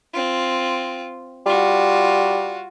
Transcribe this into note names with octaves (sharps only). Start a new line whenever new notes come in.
C4 F4
G3 F4 F#4